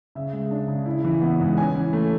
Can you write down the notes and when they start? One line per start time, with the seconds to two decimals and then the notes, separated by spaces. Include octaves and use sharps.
0.15 C#3 E5
0.33 G#3
0.51 D4
0.68 C#3
0.86 E4
1.04 E3
1.21 B3
1.40 G#2
1.57 C#4 G#5
1.74 E3
1.93 A3